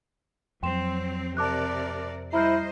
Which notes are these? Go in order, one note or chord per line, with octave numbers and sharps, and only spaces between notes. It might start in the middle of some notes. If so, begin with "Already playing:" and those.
F2 F#3 C4 G5 C6 E7
C3 A#4 D5 A5 D6 F#6
G3 E4 C5 D#5 A#5 F6 G6